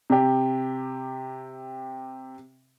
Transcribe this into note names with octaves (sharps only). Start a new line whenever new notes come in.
C3 G4